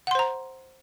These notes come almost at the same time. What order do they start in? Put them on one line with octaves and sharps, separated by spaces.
F#5 C6 C5 A#5